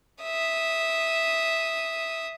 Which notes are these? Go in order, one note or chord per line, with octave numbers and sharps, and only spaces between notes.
E5 D#6